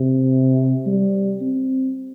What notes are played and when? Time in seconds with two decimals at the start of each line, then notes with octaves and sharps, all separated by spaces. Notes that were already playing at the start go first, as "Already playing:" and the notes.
Already playing: C3
0.86 G3
1.41 C4